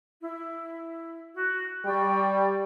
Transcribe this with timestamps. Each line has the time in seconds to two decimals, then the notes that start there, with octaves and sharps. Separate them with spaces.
0.20 E4
1.32 F#4
1.85 G3 D5 G5 C#6